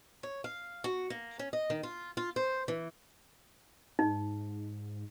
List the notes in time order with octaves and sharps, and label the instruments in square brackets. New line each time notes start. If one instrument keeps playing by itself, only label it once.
[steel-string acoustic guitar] C#5
F5
F#4
A#3
C#4
D#5
D#3
F4
F4
C5
E3
[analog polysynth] G#2 [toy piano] D#4